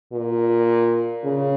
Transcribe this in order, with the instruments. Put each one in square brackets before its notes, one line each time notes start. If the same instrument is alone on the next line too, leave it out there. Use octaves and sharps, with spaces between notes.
[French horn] A#2
C#3